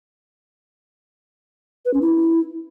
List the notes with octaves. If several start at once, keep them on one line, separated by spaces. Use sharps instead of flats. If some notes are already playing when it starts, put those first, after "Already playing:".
B4
C#4
E4